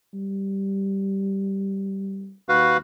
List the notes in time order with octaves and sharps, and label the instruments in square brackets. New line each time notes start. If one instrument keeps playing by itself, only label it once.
[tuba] G3
[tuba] D#2 [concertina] F#4 B4 F5